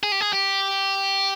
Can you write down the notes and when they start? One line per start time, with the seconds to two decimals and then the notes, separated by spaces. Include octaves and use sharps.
0.03 G#4
0.12 G4
0.21 G#4
0.33 G4